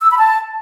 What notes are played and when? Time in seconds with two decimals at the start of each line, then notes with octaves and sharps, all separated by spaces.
0.01 E6
0.10 B5
0.19 A5